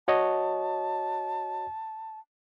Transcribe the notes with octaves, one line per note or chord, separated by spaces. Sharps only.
F#4 C#5 D#5 A5